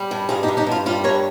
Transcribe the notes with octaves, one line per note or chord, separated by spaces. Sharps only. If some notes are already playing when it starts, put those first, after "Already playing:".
Already playing: G3
G2
G2 F4 G#4
D#4 G4
G2
D#4 G4
G2 F4
G3 F4
G2 A#4 C#5